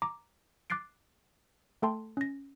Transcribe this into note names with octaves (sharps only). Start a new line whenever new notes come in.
A#5 D6
D6 F#6 A6 C7 D7
A3 A4 G5 A5 C6
C#4 A#6